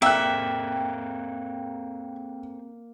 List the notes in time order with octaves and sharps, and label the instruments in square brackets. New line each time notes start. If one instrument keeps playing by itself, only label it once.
[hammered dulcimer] A#3 [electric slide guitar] C4 G#4 A4 [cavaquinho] E5 [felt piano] G5 F#6